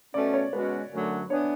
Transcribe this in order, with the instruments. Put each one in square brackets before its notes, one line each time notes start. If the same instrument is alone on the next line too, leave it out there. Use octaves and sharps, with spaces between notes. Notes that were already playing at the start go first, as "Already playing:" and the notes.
[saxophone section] B2 A3 C#4 [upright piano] D5
[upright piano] C#5
[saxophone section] B2 G#3 C#4 F#4 [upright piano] B4
[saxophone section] F#2 D3 F#3 A3
[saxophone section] E3 B3 D4 [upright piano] C#5